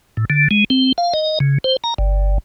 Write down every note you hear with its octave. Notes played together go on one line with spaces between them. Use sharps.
A2
D3
G#3
C4
F5
D#5
C#3
C5
A#5
G1